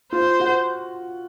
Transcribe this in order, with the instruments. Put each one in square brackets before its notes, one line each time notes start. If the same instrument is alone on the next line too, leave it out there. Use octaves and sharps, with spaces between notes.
[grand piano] F4 [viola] C5
[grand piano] F#4